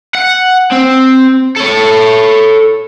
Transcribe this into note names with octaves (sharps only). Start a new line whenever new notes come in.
F#5
C4
A4 C#5